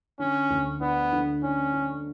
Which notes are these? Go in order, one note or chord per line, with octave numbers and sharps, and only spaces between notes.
D3 C#4
D2
B3 D4
D3
C#4 D4
D4